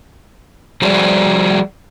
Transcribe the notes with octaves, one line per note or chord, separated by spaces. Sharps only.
F3 G3 F#4 G#4 C5 D5